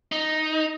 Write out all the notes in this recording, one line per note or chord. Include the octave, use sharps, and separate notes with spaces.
D#4